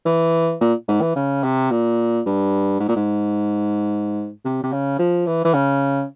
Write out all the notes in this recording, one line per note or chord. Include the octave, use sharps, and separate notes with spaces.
E3
A#2
G#2
E3
C#3
C3
A#2
G2
G#2
A#2
G#2
C3
C3
C#3
F3
E3
E3
C#3